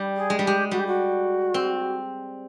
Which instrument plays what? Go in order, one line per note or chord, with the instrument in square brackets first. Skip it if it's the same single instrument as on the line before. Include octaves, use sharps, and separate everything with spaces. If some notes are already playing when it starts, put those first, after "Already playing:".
Already playing: [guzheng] G3
[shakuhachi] G#4
[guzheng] G#3
G3
[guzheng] G#3 [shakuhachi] G4
[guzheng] G3 [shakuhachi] F#4
[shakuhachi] G4
F#4
[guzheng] C4